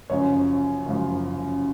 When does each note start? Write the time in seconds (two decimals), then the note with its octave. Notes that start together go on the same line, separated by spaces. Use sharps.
0.10 F#1 F#2 F3 C#5
0.86 F#1 F#2 F3